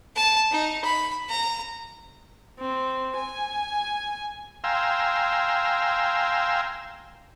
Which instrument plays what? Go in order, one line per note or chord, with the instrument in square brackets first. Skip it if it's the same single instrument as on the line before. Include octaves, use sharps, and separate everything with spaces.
[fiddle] A5
D#4
B5
A#5
[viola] C4
G#5
[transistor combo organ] F5 G5 G#5 A#5 C6 E6